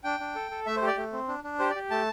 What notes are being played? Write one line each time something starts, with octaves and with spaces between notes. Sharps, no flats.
D4 G5
D4
A4
A4
A3 E5
C5
G4
D5
A3
C4
D4
D4
G4 C5
D5
G4
A3 A5